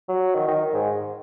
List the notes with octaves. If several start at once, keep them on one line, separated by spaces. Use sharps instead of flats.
F#3
D#3
D#3
G#2